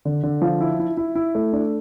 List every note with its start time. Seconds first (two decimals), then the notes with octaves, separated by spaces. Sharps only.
0.05 D3
0.23 D3
0.42 F3
0.60 E4
0.80 E4
0.97 E4
1.15 E4
1.35 A3
1.53 D4